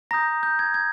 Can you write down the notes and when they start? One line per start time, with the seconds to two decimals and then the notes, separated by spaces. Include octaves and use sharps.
0.11 A#5 D#6 G6 A#6
0.43 G6
0.59 G#6
0.74 G#6